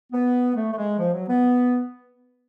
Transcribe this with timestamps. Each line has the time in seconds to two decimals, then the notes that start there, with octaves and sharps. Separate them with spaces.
0.12 B3
0.55 A3
0.71 A3
0.77 G#3
0.98 F3
1.13 F#3
1.28 B3